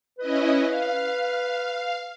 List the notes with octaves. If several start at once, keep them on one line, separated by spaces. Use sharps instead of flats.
C#4 E4 B4 D#5
F5